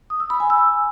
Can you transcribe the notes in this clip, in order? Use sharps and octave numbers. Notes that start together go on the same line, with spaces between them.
D#6
E6
B5
G#5
E6